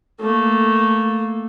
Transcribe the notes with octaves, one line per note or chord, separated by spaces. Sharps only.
A3 A#3